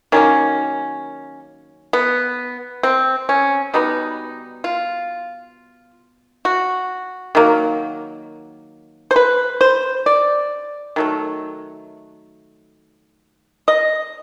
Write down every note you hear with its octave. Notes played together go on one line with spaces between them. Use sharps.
D#3 F#3 A#3 C#4
B3
C4
C#4
B2 G3 B3 D#4
F4
F#4
D#3 F#3 A#3
C5
B4
C5
D5
D#3 F#3 A3
D#5